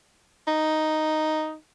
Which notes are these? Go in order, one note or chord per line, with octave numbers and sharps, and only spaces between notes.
D#4